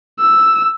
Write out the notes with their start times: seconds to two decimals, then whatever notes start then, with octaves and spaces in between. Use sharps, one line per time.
0.20 E6